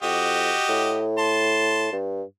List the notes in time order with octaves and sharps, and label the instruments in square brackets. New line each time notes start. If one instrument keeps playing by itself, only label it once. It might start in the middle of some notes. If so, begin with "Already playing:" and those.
[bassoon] F2 [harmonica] F#4 G4 D#5
[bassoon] A2
[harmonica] A5 C6
[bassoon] G2